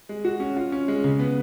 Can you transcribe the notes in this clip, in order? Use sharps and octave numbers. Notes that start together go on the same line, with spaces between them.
G#3
F#4
C#4
F4
C#4
G#3
C#3
B3